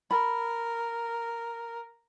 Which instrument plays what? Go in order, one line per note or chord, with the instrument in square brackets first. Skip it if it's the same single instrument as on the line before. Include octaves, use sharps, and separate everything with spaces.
[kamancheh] A#4 [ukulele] B5